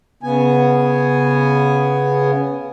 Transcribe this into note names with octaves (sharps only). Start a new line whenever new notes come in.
C#3 B3 G#5